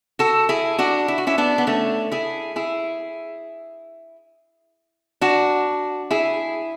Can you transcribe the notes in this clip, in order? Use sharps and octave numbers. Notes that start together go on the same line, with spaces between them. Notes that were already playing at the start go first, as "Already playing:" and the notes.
F#4 A4
E4 G#4
D4 F#4
E4
F#4
C#4 E4
B3 D4
B3
A3 C#4
E4 G#4
E4 G#4
D4 F#4
E4 G#4